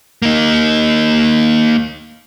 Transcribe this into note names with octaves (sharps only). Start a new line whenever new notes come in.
A#3 D#4